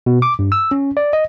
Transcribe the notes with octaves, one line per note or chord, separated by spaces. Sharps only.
B2
D6
G2
E6
C#4
D5
D#5